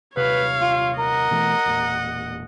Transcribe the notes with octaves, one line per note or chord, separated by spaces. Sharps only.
D#1 C3 B4 C#5 F5
F4
A#4 D#5 F#5
B2 E3 A3
E1 A#2